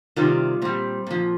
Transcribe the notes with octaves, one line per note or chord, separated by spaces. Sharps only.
C3 D#3 G3 F4
A#2 G3 C4
A#2 F3